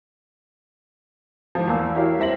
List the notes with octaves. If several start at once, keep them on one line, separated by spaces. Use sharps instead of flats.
G#1 F3
E2 A#3 E6
E4 F#4 G4 A#4 C#5 F5
G3 C4 E5 A#6 F#7